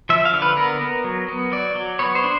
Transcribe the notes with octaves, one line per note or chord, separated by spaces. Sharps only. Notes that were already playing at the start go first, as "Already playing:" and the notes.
F3 E5
F5
D3
B4
B3 A#4
B3
F#3
B3
F#3 D5
F#3
B3 C#5
C5
D4